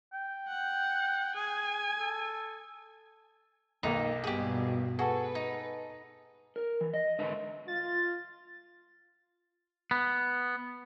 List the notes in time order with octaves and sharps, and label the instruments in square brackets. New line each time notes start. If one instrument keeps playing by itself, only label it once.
[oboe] G5
[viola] F#5
[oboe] G#4 [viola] G#5
[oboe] A4
[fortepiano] B1 D#3 A#3 [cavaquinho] D#4
[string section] G2 B2 [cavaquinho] G4 G#4
[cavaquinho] F#4 [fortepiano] G#4 A4 [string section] B4
[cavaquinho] D#4
[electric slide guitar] A#4
E3
D#5
G#2 D3 B4 E5
[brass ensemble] F4 [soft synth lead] A6
[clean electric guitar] B3